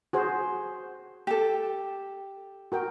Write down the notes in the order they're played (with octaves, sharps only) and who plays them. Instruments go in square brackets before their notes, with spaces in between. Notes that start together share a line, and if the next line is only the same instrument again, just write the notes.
[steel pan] F#4 G#4 C5
[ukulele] G4 A4
[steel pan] F#4 A#4 G5